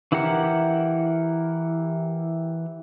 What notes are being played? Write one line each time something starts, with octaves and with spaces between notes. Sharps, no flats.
E3 E4 G4 A#4 F#5